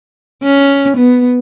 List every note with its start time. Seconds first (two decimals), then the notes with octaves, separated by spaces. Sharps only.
0.43 C#4
0.97 B3